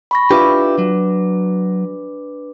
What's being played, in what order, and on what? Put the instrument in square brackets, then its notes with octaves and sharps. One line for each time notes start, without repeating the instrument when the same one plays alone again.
[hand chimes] B5 C#6 A#6
[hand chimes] D4 B4 D6 [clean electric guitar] E4 F4 G4
[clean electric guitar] F#3